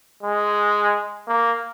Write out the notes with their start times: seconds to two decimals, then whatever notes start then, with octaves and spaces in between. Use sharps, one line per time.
0.23 G#3
1.28 A#3